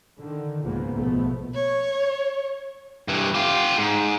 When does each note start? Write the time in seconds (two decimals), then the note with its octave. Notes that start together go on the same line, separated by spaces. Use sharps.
0.20 D3 D#3
0.63 C#2 G#2 B2 F3 A#3 B3
0.96 A#1 B2 F3 A3 B3
1.54 C#5
3.08 G2 E3
3.34 F4 G4
3.78 G#2